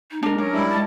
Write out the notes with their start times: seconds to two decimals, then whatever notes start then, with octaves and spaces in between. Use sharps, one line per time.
0.11 D#4
0.23 G#3 D4 A#4
0.38 F#3 C#4 D4 A#4
0.52 G3 G#3 E4
0.71 G#3 A5